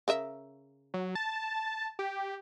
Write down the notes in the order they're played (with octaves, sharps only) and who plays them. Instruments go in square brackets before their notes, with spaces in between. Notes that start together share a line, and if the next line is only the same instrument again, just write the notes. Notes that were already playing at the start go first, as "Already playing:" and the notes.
[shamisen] C#3 A#4 E5
[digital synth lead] F#3
A5
G4